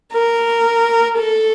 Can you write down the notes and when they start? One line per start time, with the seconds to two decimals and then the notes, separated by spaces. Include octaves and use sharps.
0.13 A#4
1.19 A4